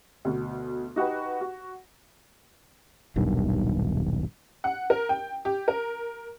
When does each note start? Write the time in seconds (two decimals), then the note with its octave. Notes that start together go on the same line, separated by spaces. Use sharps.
0.25 D2 B2
0.96 D#4 F#4 G4 B4
1.41 F#4
3.16 D#1 B1 G2 D#3
4.64 F#5
4.90 A#4
5.09 G5
5.45 G4
5.68 A#4